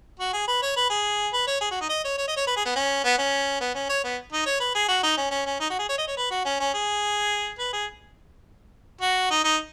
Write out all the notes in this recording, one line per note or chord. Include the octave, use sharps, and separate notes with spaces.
F#4
G#4
B4
C#5
B4
G#4
B4
C#5
G#4
F#4
D#4
D#5
C#5
C#5
D#5
C#5
B4
G#4
B3
C#4
B3
C#4
B3
C#4
C#5
B3
D#4
C#5
B4
G#4
F#4
D#4
C#4
C#4
C#4
D#4
F#4
G#4
C#5
D#5
C#5
B4
F#4
C#4
C#4
G#4
B4
G#4
F#4
D#4
D#4